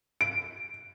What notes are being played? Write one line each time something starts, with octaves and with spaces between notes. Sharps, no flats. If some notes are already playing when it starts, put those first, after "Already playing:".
D7